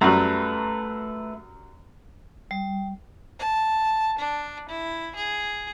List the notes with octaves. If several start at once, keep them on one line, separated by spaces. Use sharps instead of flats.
F#2 F#3 G3 A3 B4
G3
A5
D4
E4
G#4